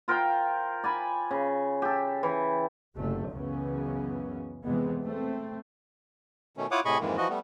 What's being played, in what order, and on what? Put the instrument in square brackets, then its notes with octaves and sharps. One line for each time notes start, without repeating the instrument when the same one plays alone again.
[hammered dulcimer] F4 A#4 C5 G5
D5 G#5 B5
C#3
G4 A4
E3
[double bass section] F#1 C3 A3
C#2 F#2 C#3 E3 B3 C#4
E2 C3 E3 G#3 B3
A3 C4
[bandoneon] B2 D#3 A3 C#4
E4 F4 C#5 F#5 D6 D#6
A2 C3 G#4 D#5 B5 C#6
F2 G#2 D#3 E3 G#3 A#3
E3 F3 F#4 D#5
G3 A3 B3